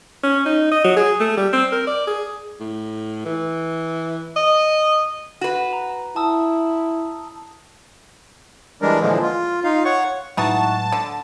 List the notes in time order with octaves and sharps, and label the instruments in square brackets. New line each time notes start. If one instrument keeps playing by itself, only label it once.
[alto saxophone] C#4
D#4
D#5
F#3
G#4
A3
G3
C4
A#4
D5
G#4
[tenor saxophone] A2
E3
D#5
[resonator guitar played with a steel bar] F#4 B4
[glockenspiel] A#5
[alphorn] E4 [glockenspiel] A5 D#6 E6
[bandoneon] E3 G3 G#3 D4 A#4
A#2 D3 E3 F3 G#3
F4
D#4 F4 F5
C#5 F#5 C#6
[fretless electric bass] A2 F#3 G#3 [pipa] E3 D#4 F#4 [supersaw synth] A5
[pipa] D3